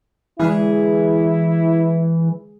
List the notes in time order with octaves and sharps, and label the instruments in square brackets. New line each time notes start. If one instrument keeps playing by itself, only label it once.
[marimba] D3 G#3 F6 [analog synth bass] E3 [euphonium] E4 [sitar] G#4